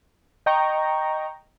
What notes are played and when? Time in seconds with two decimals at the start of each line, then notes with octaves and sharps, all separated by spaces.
0.46 D#5 G5 A#5 C#6